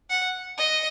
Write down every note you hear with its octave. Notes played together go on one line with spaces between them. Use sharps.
F#5
D#5